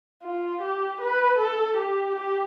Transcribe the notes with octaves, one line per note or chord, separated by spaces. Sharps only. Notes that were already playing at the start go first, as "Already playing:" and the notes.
F4
G4
B4
A4
G4
G4